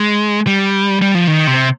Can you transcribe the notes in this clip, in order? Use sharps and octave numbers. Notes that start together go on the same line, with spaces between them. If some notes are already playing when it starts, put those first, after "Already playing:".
Already playing: G#3
G3
G3
F3
D#3
C3